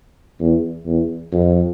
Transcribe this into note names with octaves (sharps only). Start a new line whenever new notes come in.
E2
E2
F2